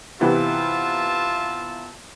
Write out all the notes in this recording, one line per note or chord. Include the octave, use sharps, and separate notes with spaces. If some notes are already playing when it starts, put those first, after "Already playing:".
C3 E3 B3 F4 E5 A5